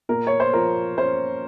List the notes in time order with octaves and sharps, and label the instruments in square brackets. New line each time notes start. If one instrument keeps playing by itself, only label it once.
[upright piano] A#2 A#4
C#5
C5
F3 A#4
C#4 C5